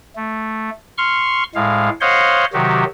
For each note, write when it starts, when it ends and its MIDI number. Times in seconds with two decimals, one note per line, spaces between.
0.16 0.70 57
0.98 1.43 84
0.98 1.43 85
0.98 1.43 89
1.55 1.89 45
1.55 1.89 56
1.55 1.89 77
2.01 2.45 72
2.01 2.45 73
2.01 2.45 75
2.01 2.45 77
2.01 2.45 78
2.01 2.45 84
2.53 2.84 48
2.53 2.84 51
2.53 2.84 54
2.53 2.84 66
2.53 2.84 67